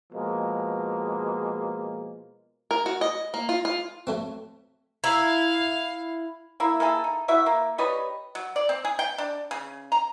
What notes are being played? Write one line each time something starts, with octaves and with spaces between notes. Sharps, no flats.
B2 F3 G#3 A#3
A#4
F#4
D#5
A#3
F4
F4
F#3 A3 C4
E4 F5 A#5 E6
A#3 E4
A#3 E4 G#4 A4
D#4
E4 F#4 E5
A#3
G3 B4 C#5 D#5
F#3
D5
C4
G#4
G5
D4
C#3
A#5